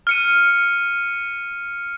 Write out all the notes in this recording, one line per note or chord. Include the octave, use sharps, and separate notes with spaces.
F6 C#7 D#7